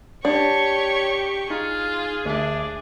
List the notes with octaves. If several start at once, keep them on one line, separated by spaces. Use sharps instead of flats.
D4 G4 C#5 C#6
D#4 F4 G#4
D2 D4 E5